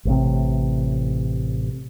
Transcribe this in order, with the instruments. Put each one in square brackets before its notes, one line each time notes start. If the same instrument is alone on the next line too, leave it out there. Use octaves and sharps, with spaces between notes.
[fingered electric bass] A1 A2 C3